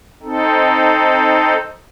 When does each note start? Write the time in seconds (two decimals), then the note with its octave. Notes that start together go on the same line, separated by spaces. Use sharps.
0.22 C4 D#4 A4